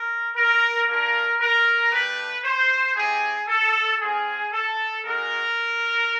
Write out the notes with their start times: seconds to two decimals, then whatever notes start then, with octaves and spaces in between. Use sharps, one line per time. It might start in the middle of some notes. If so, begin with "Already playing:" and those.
Already playing: A#4
0.35 A#4
0.87 A#3 D4 F4 A#4
1.40 A#4
1.91 A3 D4 G4 B4
2.44 C5
2.96 C4 E4 G4 G#4
3.48 A4
4.00 C4 F4 G#4
4.52 A4
5.04 G#3 C#4 F#4 A#4